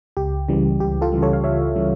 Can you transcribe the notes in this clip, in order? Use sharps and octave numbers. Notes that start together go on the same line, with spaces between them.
C#2 G4
C#3 E3 G3
C#2 G4
F4 A4
C#3 E3 G3
A4 C#5
F5
C#2 C#5 E5
C#3 E3 G3